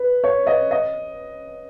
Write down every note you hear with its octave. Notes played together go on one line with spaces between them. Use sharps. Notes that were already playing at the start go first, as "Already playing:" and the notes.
Already playing: B4
C#5
D#5
D#5